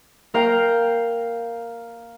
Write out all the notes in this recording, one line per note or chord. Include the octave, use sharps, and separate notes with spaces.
A#3 A#4 F5 G5